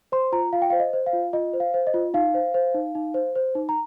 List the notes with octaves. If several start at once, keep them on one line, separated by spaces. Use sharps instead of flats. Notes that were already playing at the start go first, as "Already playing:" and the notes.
C5 C6
F4 A#5
F4 F5
G5
C5 F5
D#5
C5
F5
F4
F4 D#5
C5
F5
C5
D#5
F4
D#4 F5
C5
C5
D#4
D#4
C5
C5
D#4
A#5